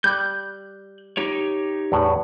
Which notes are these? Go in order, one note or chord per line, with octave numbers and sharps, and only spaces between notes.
G3 F#6 G6
D#4 G4 C#5
E2 A2 F#5